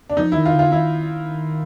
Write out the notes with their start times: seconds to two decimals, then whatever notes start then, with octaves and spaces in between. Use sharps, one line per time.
0.10 D4
0.17 F3 D#4
0.32 D#3 E4
0.46 F4
0.54 D3
0.59 F4
0.72 D#3 E4